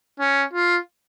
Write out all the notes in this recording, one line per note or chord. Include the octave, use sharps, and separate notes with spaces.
C#4
F4